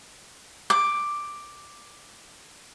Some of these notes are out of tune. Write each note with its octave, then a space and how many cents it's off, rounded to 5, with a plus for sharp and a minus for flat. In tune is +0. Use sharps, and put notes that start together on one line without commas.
D6 +5